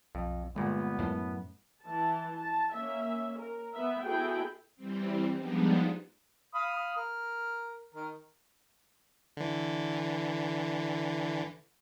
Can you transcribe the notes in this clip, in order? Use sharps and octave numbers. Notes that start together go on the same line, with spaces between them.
B1 F2
G1 A#2 G#3 B3
F#2 A2
E3 A5
A5
A#3 C#4 E5
A#4
B3 E5
B3 E4 F#4 G#4 A4 G5
E3 G3 C4
F3 G3 G#3 B3 D4 D#4
F5 B5 D#6
A#4 F6
D#3 A#4
D3 E3